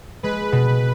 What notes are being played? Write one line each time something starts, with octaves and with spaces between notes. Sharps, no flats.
G#3 B4
B2